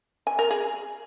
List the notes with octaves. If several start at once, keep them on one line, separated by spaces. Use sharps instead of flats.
G#5
A#4
G#4